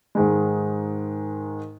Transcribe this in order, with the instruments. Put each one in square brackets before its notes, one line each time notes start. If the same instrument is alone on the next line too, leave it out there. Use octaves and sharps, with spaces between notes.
[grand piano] G#2 D#3 G#3